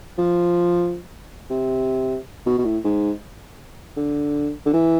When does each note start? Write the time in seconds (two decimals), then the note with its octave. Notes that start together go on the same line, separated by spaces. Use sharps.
0.18 F3
1.50 C3
2.46 B2
2.58 B2
2.65 A2
2.84 G#2
3.97 D3
4.66 D3
4.73 E3